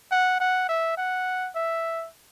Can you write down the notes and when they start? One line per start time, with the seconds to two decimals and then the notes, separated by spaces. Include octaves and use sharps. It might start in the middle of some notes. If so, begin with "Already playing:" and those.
0.11 F#5
0.40 F#5
0.69 E5
0.97 F#5
1.55 E5